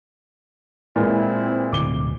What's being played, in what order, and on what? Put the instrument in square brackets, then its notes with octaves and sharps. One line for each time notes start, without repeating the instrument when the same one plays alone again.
[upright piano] A#2 E3 G#3 [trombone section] C4 E4
[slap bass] D1 D2 B2 [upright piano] D6 G7